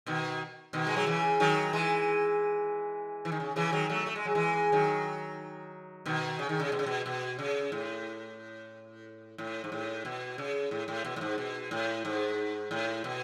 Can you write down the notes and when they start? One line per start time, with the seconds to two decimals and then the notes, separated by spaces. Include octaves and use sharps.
0.06 B2 D#3
0.73 B2 D#3
0.87 G#3
0.96 F#3
1.06 C#3 E3
1.40 D#3 F#3
1.73 E3 G#3
3.25 E3
3.32 D#3
3.40 C#3
3.56 C#3 E3
3.72 D#3 F#3
3.89 F#3 A3
4.07 A3
4.15 G#3
4.25 F#3
4.35 E3 G#3
4.72 D#3 F#3
6.06 B2 D#3
6.39 C#3
6.49 D#3
6.60 C#3
6.72 B2
6.79 C#3
6.86 B2
7.06 B2
7.39 C#3
7.72 A2
9.38 A2
9.64 G#2
9.72 A2
10.05 B2
10.38 C#3
10.71 A2
10.88 A2
11.04 B2
11.16 A2
11.21 G#2
11.38 B2
11.71 A2
12.05 G#2
12.71 A2
13.04 B2